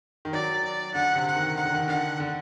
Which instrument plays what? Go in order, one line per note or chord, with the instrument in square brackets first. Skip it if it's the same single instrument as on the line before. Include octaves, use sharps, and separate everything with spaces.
[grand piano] D#3
[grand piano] F#3 [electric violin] D5
[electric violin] D5
[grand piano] D3 [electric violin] F#5
[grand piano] C3
[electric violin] F#5
[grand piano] D#3
[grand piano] D#3 [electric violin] F#5
[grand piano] D3
D#3
[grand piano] D3 [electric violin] F#5
[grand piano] D3